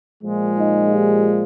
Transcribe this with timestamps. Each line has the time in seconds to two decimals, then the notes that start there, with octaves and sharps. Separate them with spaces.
0.22 A#2 F3 G#3
0.58 D#4
0.94 G4